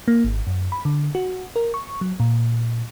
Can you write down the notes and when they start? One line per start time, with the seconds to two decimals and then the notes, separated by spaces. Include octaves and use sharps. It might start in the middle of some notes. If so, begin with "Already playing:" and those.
0.08 A#3
0.24 G#1
0.47 F#2
0.72 B5
0.85 D3
1.15 F#4
1.56 A#4
1.74 C#6
2.01 F#3
2.20 A#2